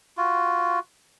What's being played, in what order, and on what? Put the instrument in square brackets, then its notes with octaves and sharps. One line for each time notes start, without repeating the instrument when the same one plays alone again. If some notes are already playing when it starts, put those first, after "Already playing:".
[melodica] F4 F#4